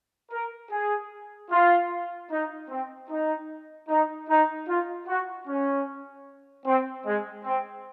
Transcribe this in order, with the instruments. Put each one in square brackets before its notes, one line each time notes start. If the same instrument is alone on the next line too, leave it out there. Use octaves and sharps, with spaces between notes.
[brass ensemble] A#4
G#4
F4
D#4
C4
D#4
D#4
D#4
F4
F#4
C#4
C4
G#3
C4